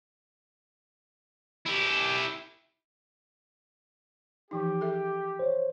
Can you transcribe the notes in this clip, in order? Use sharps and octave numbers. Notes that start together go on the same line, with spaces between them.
E4 G4
E3 F3 D#4 G4
G#4 A4 E5
C5 C#5